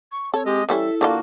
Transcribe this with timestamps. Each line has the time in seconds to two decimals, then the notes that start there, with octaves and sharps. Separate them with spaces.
0.12 C#6
0.34 C4 A4 C#5
0.46 G#3 G4 D#5
0.69 E3 G3 C#4 E4 A4 E5
1.01 D3 A#3 D4 F4 F#4